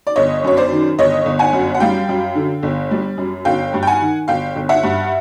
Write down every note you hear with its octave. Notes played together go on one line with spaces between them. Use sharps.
D5
G1 C#5 D#5
F#2 C#5
C5 D5
D#3
G1 C#5 D#5
G1
F#5 G#5
F#2
F#5
G3 F5 G5
F#2
D3
G1
G3
F#2
G1 F5 G5
G2
G5
F#5 G#5
D#3
G1 F5 G5
G1
E5 F#5
G2